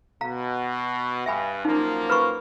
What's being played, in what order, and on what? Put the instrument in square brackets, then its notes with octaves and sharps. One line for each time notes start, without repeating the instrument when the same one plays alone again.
[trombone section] B2 [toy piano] F5 A#5
[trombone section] G2 [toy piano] E5 G#5 B5
[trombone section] F#2 F3 A#3 [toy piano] D#4
[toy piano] B4 B5 C#6